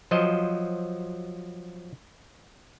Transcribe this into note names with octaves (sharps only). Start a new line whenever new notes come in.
F3 F#3 C5 D#5